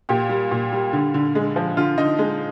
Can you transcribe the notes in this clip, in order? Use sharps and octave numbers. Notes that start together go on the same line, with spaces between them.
A#2 G4
G3
A#2
G3
D3
D3
G#3
F3
D3 F4
D3 D#4
G#3